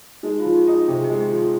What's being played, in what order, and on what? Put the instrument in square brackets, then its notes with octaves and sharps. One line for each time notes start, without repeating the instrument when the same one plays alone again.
[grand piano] G#3 [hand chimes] D#4
[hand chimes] F4
[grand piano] F3
[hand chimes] G4
[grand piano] D#4
[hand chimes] G#4
[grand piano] C3 [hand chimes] G4
[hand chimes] G#4
G4
[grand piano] G#3
[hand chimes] G4
[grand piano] F3